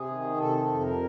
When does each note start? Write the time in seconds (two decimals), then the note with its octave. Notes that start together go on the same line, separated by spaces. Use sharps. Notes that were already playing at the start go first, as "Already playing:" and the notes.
Already playing: C3 G#4
0.09 D#3
0.37 C3 A4
0.66 F2
0.80 A#4